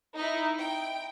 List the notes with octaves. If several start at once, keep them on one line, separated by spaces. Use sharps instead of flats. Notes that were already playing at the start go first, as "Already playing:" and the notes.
D#4 E4
G5